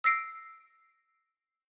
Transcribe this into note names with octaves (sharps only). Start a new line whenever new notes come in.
E6 A#6 C7 D7